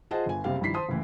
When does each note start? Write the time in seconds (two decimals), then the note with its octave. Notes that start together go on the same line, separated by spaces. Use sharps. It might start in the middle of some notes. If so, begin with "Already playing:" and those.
0.11 F4 G#4 C5 D#5 F#5 A5
0.26 G1 G#5
0.44 F#1 C3 G3 C4 F5
0.61 G2 D#3 F3 E4 B6 C7
0.74 C5 A5 C6 D#6
0.89 F#1 A2 E3